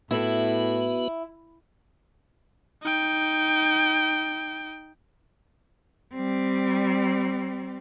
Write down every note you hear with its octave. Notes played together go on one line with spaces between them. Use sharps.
A2 B3 E4 F#4 B4
D#4 G5
G3 C4